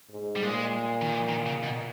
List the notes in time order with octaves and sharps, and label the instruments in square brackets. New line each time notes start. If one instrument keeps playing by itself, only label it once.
[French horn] G#2
[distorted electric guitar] G3
[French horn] A#2 [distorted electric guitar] G#3
[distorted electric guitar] D#3
E3
D#3
C#3
B2